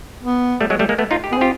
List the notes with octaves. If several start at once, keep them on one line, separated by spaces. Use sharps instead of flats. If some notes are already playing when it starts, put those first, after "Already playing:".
B3
G3 A3
F#3 G#3
G3 A3
G#3 A#3
A3 B3
D#4 F4
G4
B3 G#4
C4 F4 G4